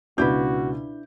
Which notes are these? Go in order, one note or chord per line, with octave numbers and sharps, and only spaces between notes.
C#2 B2 D4 E4 F#4 B4 G6